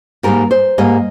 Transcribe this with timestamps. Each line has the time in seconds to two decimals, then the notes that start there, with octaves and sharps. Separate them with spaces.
0.23 G#2 G3 A#3 A#4
0.51 C5
0.78 G#2 G3 A#3 D#5